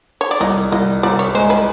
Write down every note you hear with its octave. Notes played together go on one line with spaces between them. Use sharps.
C#5
D5
C2 D#5
C2 D#5
C2 D5
C#5
G#3 C5
B4